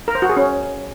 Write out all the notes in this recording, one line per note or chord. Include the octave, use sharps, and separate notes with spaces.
A#4
C5
F#4
G#4
C#4